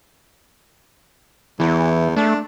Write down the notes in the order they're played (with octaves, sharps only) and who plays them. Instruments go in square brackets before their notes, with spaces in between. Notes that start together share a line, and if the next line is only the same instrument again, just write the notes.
[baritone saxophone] E2 [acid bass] E3
[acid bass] A3 [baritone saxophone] D4